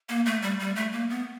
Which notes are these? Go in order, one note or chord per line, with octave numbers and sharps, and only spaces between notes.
A#3
A3
G3
G3
A3
A#3
B3